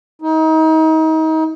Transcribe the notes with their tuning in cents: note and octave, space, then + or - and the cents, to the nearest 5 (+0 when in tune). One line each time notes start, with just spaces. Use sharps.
D#4 +35